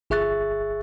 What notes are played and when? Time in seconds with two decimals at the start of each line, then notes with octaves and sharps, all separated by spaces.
0.10 G1 G#4 E5 C#6 F#6 A6